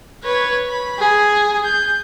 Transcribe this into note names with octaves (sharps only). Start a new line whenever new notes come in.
B4 C#5
B5
G#4
G6